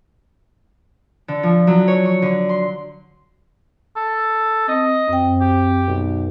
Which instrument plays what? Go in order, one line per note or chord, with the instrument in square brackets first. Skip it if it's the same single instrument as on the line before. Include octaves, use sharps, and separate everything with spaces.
[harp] D3
F3
F#3
C#5
C#6
D3
C6
[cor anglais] A4
[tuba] C4 [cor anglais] D#5
[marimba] F#2 G5 [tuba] C4
[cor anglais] G4
[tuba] B1